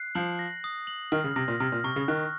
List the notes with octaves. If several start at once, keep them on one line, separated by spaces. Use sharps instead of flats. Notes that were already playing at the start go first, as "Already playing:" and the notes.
Already playing: F#6 C7
F3 F#7
A#6
D#6
F#7
D#3 F6
C#3
C3 A#6
A#2
C3 F6
A#2
C3 C#6
C#3
D#3 F#6